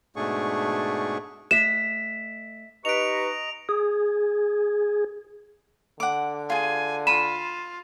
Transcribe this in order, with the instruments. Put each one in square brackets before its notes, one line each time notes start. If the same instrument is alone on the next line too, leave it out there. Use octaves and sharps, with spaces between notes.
[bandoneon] G#2 B2 A3 D4 G#4 C#6
[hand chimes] A3 E5 B6 [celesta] E7
[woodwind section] D#4 G4 B4 [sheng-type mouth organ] D#5 A#5 [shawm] C#6 [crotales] D7 F7
[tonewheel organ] G#4
[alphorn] D3 [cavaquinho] F#5 D6
[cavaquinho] F4 G#4 [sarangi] G#5
[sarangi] F4 [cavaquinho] B5 [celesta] D#7 E7